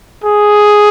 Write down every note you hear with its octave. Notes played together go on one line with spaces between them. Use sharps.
G#4